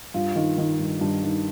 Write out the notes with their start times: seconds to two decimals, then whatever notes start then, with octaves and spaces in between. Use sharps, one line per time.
0.14 G2 F4
0.36 D#3
0.58 D#3
0.79 G2
1.01 G2
1.24 D#3